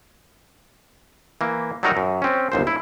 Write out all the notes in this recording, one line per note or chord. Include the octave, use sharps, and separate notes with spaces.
E3 A#3
F#3 G3 A3 D#4 F#4 A#4
F#2
C4 C#4
G1 D#2 C5
E4